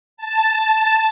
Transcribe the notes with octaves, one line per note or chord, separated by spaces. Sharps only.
A5